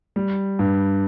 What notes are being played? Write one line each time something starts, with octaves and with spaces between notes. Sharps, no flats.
G3
G2